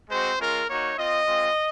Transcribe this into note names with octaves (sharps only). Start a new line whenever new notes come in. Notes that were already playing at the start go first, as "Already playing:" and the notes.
G#3 C4 F#4 C5
G#3 C#4 F4 A#4
A#3 D#4 F#4 C#5
C4 F4 D#5
G#3 C4 F4